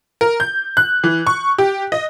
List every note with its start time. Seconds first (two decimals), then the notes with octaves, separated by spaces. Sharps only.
0.21 A#4
0.40 G6
0.77 F#6
1.04 E3
1.27 C#6
1.58 G4
1.92 D#5